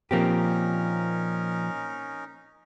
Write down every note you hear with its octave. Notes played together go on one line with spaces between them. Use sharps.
A#2 F3 A#3 C4 C#4 D#4 G4 A#4